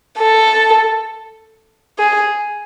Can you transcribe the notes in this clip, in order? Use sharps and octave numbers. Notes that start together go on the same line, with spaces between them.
A4
G#4